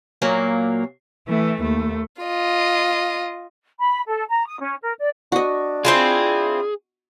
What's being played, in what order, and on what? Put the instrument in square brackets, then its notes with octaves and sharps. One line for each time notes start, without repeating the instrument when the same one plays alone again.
[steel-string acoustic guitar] A#2 F#3 A#3
[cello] E3 A3
D#2 A3
[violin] F4 D#5
[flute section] B5
A4
A#5
D#6
C#4
A#4
D5
[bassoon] D4 [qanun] F#4 D#5
[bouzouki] C4 E4 F4 [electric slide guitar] G#4